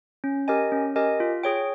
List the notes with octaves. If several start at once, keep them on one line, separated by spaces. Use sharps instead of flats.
C#4
G4 A#4 D#5 G#5
C#4
G4 A#4 D#5 G#5
F4
G#4 C#5 G5